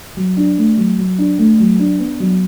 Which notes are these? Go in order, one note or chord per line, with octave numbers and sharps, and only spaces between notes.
F#3
D4
A3
F#3
F#3
D4
A3
F#3
D4
B3
F#3